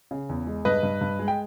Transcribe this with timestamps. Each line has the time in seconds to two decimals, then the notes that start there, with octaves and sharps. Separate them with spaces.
0.11 C#3
0.29 E2
0.47 G#3
0.65 G2 B4 D#5
0.83 G2
1.01 G2
1.19 G#3
1.28 G5